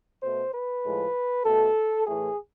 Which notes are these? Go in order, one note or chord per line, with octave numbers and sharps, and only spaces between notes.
B2 A3 C5
B4
A2 F3 G#3
B2 A3 A4
A2 E3 A3 G#4